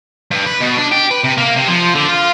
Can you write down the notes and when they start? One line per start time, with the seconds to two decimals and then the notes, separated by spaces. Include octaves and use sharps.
0.31 G2
0.46 B4
0.61 B2
0.78 D4
0.92 G4
1.11 B4
1.24 C3
1.37 A#3
1.56 C3
1.67 F3
1.95 D3
2.08 F4